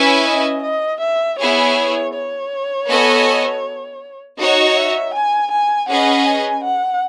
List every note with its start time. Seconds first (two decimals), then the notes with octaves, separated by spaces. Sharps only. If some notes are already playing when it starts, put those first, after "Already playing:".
Already playing: C#4 E4 B4 E5 G#5
0.25 D#5
0.63 D#5
1.00 E5
1.39 B3 E4 G#4 C#5
2.14 C#5
2.88 B3 F#4 A4 D#5 G#5
4.38 D#4 F#4 C#5 D#5
4.76 E5
5.14 G#5
5.52 G#5
5.89 C#4 G#4 B4 D#5 F#5
6.26 G#5
6.64 F#5